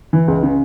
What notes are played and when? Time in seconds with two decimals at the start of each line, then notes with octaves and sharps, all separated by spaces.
0.13 E3
0.28 C#2
0.43 C#3